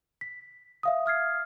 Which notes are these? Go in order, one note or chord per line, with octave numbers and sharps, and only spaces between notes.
B6
E5 F5 D#6
D#6 F6 G#6 C7